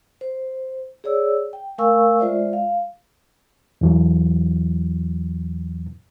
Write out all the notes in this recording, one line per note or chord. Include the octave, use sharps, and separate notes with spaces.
C5
G#4 C#5 D5 E6
G5
A3 A#4 F5 G#5 C#6 E6
G#3 F4 C5 D5 E5
F5
E2 E3 F#3